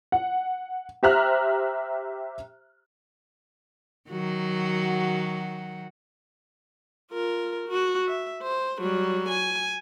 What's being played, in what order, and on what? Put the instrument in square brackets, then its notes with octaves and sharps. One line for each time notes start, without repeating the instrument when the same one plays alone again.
[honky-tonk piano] F#5
G4 C5 E5 A#5 F6 F#6
[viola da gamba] D#3 F#3 F#4
[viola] F4 A#4
F#4
E5
C5
F#3 G3
G#5